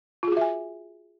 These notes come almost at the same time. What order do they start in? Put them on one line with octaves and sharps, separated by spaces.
F4 G#4 F#4 E5 G#5